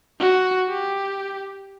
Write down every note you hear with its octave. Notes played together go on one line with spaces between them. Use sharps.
F#4
G4